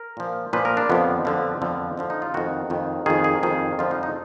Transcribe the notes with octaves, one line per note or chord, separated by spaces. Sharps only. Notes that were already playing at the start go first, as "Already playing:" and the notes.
Already playing: A#4
A#2 F3
A#2 F3 B4
A#4
D4
F2 D3 F3 B3
F2 D3 F3
F2 D3 F3
F2 D3 F3
D#4
F4
F2 D#3 F#4
F2 D#3
F2 D#3 G#4
G#4
F2 D#3 G#4
F2 D3 F3 F4
D#4
D#4